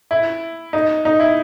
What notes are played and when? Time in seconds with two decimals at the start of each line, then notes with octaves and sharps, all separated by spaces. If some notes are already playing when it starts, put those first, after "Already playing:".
0.11 E4
0.73 D#4
1.05 D#4
1.20 E4